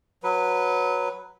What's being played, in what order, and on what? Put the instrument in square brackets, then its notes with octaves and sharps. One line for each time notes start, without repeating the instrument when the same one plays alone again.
[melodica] F#3 B4